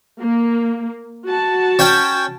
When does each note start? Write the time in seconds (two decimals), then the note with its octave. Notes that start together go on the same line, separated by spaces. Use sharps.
0.20 A#3
1.28 F#4 A5
1.79 C#4 G5